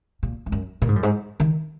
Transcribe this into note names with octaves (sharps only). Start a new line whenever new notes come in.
A#2
G#2
F#2
A#2
G#2
F#2
G#2
D#3